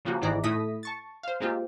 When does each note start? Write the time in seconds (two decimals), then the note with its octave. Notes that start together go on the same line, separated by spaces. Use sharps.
0.05 C#3 F3 G3 A#3 F#4
0.21 G1 G#2 D#3 E3 D5 A#5
0.44 A2 A3 E4 D#6 A#6 B6
0.83 A5 C#6 A6
1.23 C5 F5
1.40 G#3 A#3 C4 F4 G4